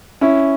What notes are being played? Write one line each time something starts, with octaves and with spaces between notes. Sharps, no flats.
C#4 E4